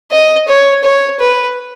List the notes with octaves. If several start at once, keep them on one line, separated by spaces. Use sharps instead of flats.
D#5
C#5
C#5
B4